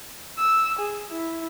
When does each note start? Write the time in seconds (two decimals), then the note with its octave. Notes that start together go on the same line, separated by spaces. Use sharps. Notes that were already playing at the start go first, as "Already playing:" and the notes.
0.38 E6
0.79 G#4
1.11 E4